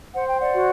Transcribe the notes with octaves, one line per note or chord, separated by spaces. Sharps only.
C5 F#5
G5
D5 F#5
F#4